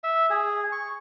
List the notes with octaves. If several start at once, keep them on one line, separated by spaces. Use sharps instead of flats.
E5
G#4
C#6